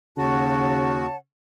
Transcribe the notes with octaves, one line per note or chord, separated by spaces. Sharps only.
D#2 C#3 F#4 C#5 F#5 A5